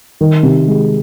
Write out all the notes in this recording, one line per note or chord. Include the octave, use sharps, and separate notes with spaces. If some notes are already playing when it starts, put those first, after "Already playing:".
D#3
C3
G#3